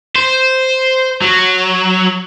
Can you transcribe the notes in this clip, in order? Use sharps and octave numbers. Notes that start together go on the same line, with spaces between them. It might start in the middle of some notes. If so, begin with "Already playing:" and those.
C5
F#3